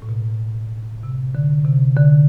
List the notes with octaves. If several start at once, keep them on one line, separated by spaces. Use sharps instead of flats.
A2
B2
C3
D3
C3
D3